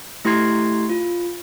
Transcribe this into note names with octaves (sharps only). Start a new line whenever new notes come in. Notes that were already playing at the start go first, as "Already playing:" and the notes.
A3 E4 G4 C6 G#6 C7
F4